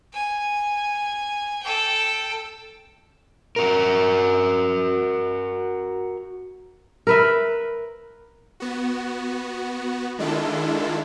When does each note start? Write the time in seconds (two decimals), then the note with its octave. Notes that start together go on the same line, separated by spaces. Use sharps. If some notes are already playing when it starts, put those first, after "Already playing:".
0.14 G#5
1.63 A4 G5
3.56 F#4 A#4
7.07 A#4 B4 E5
8.60 B3 F#4
10.18 D#3 G#3 D4 E4 F4 A4